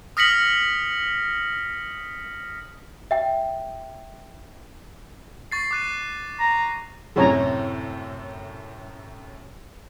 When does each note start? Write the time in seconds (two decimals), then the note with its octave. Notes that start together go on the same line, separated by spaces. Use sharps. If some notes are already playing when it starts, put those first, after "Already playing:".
0.17 D#6 F6 A#6 B6 C#7 F#7
3.11 E5 G5
5.52 C#6 A6 C7
5.71 D6 F#6 D#7
6.39 A#5
7.16 F#2 A2 C3 G#4 C#5 A#5